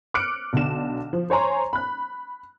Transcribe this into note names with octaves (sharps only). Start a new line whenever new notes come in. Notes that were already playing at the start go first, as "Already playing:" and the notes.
D6 F6 F#6 C#7 D7
B1 D3 D4 E7
F3
C5 C#5 G#5 A#5 C6
B5 F#6